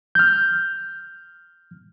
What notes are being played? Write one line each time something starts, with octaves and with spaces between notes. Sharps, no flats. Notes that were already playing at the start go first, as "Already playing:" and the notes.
F6 G6